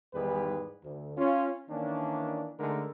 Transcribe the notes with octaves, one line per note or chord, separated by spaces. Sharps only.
E2 G#2 D#3 G3 G#4 B4
D2
C#4 F4
D#3 E3 A#3 C#4 D4
D3 G#3 A3 D#4 A4 A#4